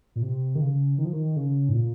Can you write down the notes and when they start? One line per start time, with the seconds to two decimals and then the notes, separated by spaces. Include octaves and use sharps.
0.16 A#2
0.23 C3
0.55 D#3
0.61 C#3
0.98 D#3
1.05 F3
1.13 D#3
1.36 C#3
1.69 G#2
1.73 A#2